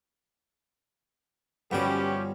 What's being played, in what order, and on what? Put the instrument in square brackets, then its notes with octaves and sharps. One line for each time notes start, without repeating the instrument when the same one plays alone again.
[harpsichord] G2 D3 F#4 [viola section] F3 C#4 [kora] G3 B3 [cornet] G4